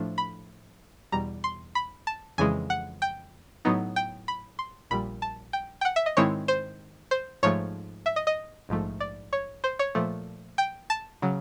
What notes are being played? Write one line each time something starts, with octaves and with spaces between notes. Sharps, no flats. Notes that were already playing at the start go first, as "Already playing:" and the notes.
Already playing: A2 F3 A3 D4
B5
E2 B2 G3 A#5
C6
B5
A5
F2 C#3 E3 G#3 G#5
F#5
G5
A2 F#3 B3 D#4
G5
B5
C6
A#1 A#2 G3 B5
A5
G5
G5
F#5
E5
D#5
G#2 D#3 G#3 C4 E4 C#5
C5
C5
G#2 F3 A3 C#5
E5
D#5
D#5
A#1 G#2 F3 A3
D5
C#5
C5
C#5
A#2 F3 A3
G5
A5
C#3 F#3